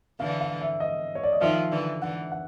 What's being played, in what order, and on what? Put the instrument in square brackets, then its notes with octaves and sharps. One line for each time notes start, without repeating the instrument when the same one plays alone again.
[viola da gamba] D3 E3 [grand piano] F5
[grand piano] F5
E5
D#5
C#5
D5
D#5
[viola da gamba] D#3 F3 [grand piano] E5
[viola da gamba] D3 E3
[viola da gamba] D3 E3 [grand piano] F#5
[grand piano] F#5